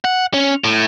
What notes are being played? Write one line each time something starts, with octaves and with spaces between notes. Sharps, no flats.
F#5
C#4
A2